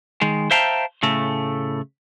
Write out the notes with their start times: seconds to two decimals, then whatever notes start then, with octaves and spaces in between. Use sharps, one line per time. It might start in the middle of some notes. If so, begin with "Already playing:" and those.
0.22 D#3 G#3
0.51 C5 E5 F5 G5 A5 A#5
1.03 A2 C#3 A3